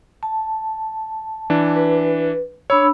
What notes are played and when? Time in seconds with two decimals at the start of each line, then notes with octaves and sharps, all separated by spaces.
0.23 A5
1.50 E3 D4
1.76 B4
2.70 D4 C#5 B5 E6